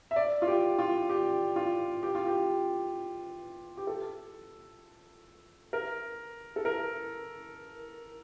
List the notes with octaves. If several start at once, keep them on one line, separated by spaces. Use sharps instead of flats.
E5
D5
F4
G4
F4
G4
F4
G4
F4
G4
G4
A4
A#4
A4
A#4